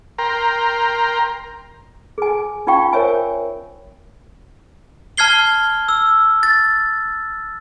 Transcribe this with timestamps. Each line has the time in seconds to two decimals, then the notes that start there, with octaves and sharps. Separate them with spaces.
0.18 A#4 G5 A#5 C6
2.18 G#4 G#5
2.67 C#4 D#4 F4 F5 G5 C#6
2.93 A#4 C5 C#5 E5 G#5
5.17 A5 F6 G#6 C7 G7
5.88 E6
6.43 A6